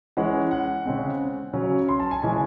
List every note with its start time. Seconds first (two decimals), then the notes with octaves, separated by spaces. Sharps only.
0.17 E3 G#3 C#4 F#5
0.51 F#5
0.86 C#3 G#3 C4
1.53 C#3 F#3 C#4
1.89 C6
2.00 A5
2.11 G#5
2.22 C#3 E3 G#3 C#4 G#5